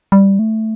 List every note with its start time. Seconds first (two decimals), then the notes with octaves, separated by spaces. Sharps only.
0.12 G3
0.39 A3